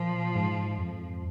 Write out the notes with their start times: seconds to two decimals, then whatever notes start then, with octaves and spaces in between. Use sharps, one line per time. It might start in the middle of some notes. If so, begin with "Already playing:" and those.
Already playing: A#2 F3
0.35 G#2
0.78 F2